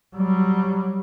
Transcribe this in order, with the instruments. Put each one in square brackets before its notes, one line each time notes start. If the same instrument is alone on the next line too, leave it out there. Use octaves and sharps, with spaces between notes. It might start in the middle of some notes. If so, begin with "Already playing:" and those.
[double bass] F#3 G3